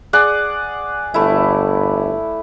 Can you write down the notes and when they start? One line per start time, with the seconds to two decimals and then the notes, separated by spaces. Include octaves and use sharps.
0.13 G#4 D5 F#5
1.14 G1 A3 E4